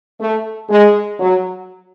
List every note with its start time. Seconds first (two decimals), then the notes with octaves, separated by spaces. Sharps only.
0.20 A3
0.69 G#3
1.19 F#3